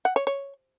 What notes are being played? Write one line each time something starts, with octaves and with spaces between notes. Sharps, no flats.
F#5
C#5
C#5